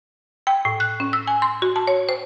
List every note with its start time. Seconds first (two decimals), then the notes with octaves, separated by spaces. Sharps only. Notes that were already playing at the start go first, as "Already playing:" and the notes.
0.47 G5
0.65 A2
0.80 F#6
1.00 C#4
1.13 E6
1.27 G#5
1.42 C6
1.62 F#4
1.76 A5
1.87 C#5
2.09 C5